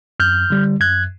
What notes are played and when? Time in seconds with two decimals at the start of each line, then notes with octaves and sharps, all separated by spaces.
0.20 F#2 F6 G6
0.50 D3 G3
0.81 F#2 F#6 G#6